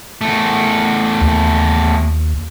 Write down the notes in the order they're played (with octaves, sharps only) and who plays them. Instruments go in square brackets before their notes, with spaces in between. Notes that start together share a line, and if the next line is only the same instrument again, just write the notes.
[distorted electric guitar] E2 A3
[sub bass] D#2